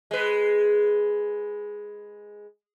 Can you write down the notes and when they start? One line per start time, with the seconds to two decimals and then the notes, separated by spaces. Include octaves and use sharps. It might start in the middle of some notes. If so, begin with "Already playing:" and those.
0.11 G#3 B4